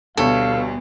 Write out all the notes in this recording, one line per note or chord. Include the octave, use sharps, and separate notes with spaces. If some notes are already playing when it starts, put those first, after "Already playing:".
D2 B2 G3 A4 C#5 F5